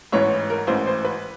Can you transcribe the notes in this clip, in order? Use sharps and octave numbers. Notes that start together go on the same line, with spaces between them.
A1 G#2 E3 C#5
A#4
A1 G#2 E3 C5
C5
B4